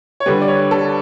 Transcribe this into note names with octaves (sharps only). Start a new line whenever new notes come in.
C#5
D3 G3 B4
D5
C#5
A4